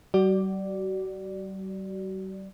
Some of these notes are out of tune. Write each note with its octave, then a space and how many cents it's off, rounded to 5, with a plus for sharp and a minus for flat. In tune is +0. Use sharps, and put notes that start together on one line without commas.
G3 -40 F#4 +35 D5 +0